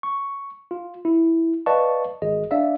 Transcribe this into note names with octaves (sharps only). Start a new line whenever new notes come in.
C#6
F4
E4
B4 D5 D#5 F5 A5 C#6
G#1 G#4 D#5
D4 D5 E5 F5